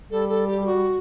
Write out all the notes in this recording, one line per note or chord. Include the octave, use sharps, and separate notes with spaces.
G3 A4
A4
G4
G4
F#4